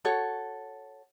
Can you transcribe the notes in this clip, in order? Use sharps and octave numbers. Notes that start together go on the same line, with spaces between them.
F#4 A4 C#5